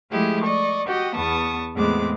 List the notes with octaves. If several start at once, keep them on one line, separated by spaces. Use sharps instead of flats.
F3 G#3 A3 E4 G4 G#4
D5 D#5 C#6
F#4 G4 D#5 G5
E2 B3 A5 C#6 D#6
E2 A2 G#3 B3 C4 D6